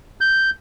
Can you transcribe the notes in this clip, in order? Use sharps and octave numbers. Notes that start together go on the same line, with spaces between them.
G6